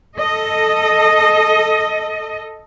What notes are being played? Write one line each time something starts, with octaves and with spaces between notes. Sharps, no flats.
A4 D#5